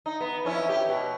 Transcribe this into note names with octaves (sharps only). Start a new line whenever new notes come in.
D#4
B3
F2 C#4 E4
G4
B2